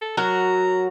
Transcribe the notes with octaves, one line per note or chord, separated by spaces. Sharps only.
A4
F#3 F#4 A#4 A#5